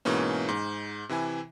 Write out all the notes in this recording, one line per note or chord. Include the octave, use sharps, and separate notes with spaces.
G#2 B2 E3 A#3 C#4
G#2
C3 E3 E4 G#5